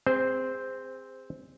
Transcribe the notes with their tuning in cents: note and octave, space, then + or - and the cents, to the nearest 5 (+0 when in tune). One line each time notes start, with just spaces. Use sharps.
C4 +0 G#4 -35 C5 -15